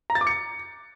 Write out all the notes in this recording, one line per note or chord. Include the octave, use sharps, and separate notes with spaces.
A#5
A6
D6
C#7